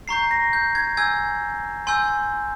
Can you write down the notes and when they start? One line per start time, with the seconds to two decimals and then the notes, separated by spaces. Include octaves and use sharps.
0.08 A#5 C#6 G6 C7
0.31 A#6
0.53 G6
0.75 G#6
0.97 G#5 E6 G6 G#6
1.87 G#5 C6 E6 G6